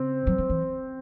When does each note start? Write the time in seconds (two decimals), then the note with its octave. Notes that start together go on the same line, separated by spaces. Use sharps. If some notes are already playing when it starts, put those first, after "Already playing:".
Already playing: C#3 C4
0.27 F#3
0.38 F3
0.49 E3